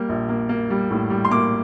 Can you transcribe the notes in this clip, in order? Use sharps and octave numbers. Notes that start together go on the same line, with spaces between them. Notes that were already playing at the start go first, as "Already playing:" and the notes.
Already playing: G3 A#3
A#1
A#3
A#3
G3
A2
G3
C6
A#3 D6